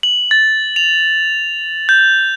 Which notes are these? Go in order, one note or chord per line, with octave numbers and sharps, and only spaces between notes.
F#7
A6
F7
G6